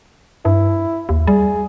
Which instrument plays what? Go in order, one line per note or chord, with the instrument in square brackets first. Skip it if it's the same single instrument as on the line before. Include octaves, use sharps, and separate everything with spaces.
[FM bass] G2 [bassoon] E4
[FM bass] D#2
[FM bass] G3 [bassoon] G#4